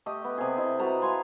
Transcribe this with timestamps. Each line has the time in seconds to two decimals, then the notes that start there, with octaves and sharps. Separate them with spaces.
0.06 A3 G4 D#5
0.24 B3
0.38 C3 G#4
0.56 C4 E4 D#5
0.79 F#4 B4 A5 A#5
1.02 F5 G#5 A#5 C6